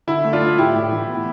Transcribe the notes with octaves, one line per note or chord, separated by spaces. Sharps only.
D3 E4
A3
D4 F4
A3
A2 E4 G4
A2
E3
B3